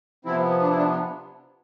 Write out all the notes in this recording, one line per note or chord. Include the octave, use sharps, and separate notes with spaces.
C3 F3 B3 C4 E4
D4
E4
D4